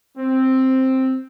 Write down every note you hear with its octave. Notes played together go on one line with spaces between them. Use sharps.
C4